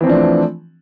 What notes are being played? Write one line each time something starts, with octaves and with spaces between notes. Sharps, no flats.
E3 F3 A3 C4 D4